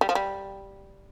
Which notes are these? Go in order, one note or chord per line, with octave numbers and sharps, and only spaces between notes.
G3
F3
G3